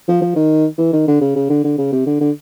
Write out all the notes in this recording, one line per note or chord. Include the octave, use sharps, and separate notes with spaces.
F3
F3
D#3
E3
D#3
D3
C#3
C#3
D3
D3
C#3
C3
D3
D3